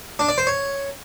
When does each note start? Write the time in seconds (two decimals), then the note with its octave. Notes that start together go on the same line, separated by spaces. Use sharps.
0.19 D4
0.29 D5
0.38 C5
0.47 C#5